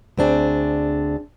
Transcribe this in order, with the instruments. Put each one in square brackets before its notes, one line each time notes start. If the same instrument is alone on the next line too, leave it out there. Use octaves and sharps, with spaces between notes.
[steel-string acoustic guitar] D2 C4 D4 G#4